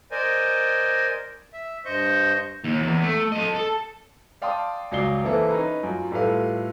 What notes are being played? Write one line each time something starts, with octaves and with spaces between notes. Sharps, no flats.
A#4 C5 D5 D#5 G#5
E5
G2 C5 D#5 C#6 G6
D#2
E2
A3
A4 D#5
A4
D5 F5 G5 A5 C6 D#6
C#2 F#2 F#3 D5 C7 G7
E3 A#3 C4 E4 A4 B4
C#4 D#4 B4 A#5 B5
F#2 F4
A2 G3 F4 A4 B4 F5